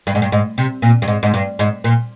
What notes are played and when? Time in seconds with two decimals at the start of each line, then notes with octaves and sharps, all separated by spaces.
0.07 G2
0.15 G#2
0.22 G2
0.32 G#2
0.58 C3
0.82 A#2
1.02 G2
1.08 G#2
1.23 G#2
1.34 G2
1.59 G#2
1.84 A#2